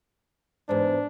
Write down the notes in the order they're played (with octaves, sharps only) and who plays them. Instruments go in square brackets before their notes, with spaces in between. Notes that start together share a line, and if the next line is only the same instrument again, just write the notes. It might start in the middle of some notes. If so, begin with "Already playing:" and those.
[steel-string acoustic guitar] E2 G#2 [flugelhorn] D4